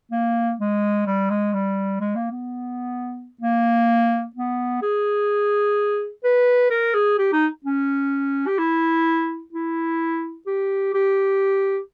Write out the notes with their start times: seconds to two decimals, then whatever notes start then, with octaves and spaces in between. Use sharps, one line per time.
0.11 A#3
0.60 G#3
1.06 G3
1.30 G#3
1.54 G3
2.00 G#3
2.15 A#3
2.31 B3
3.41 A#3
4.36 B3
4.82 G#4
6.24 B4
6.70 A#4
6.94 G#4
7.18 G4
7.32 D#4
7.65 C#4
8.47 G4
8.58 E4
9.53 E4
10.46 G4
10.94 G4